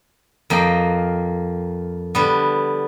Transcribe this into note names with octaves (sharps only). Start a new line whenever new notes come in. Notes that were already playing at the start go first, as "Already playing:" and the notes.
F2 A#3 D#5 G5
D3 G3 B3